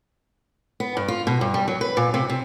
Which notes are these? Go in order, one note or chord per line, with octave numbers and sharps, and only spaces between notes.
B3
G2
F4
B2
G2
G3
F#3
B4
A#2
C3
C3